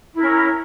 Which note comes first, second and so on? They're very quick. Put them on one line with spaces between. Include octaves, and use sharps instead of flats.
E4 A#4 C#4